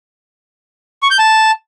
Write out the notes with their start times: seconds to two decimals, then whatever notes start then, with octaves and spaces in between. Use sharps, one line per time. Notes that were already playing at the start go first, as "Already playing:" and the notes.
1.03 C#6
1.11 G6
1.19 A5